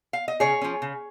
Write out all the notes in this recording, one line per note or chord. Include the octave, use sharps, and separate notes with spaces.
F5
D#5
C#3 G#4 C#5
F3 C#4
C#3